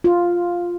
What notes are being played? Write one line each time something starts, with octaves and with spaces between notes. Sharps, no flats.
F4